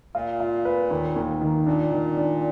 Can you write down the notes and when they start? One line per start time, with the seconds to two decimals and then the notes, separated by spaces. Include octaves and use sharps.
0.15 A#2 F4
0.40 F4
0.65 B4
0.91 D#2
1.16 D#2
1.41 D#3
1.66 A#2 D4
1.92 D#3
2.17 D4